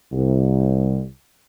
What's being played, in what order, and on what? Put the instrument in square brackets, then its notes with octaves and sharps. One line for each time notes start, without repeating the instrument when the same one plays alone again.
[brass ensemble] C2